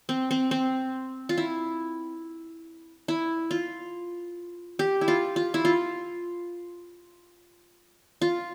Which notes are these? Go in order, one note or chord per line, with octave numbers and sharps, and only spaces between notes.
C4
C4
C4
F4
E4
E4
F4
G4
E4
F4
F4
E4
F4
F4